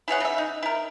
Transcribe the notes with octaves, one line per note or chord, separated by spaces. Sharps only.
E4 G#4 C#5 F#5
C#3 E5
D#4
E4 A#4